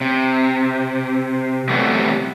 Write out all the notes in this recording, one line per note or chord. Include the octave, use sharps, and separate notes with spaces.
C3
C3 E3 F#3 G3 A3 B3